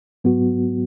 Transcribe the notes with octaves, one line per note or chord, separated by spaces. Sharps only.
G#2 F#3 B3 F#4